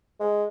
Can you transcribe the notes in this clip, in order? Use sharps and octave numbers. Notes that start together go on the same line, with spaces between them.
G#3